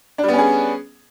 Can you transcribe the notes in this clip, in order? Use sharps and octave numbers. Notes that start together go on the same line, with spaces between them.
G3 B3 C#4 D4 G#4